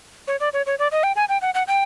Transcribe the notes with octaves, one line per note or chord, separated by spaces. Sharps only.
C#5
D5
C#5
C#5
D5
D#5
G5
G#5
G5
F#5
F#5
G5